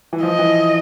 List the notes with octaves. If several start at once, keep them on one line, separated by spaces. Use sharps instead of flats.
E3
F3 D#5
E3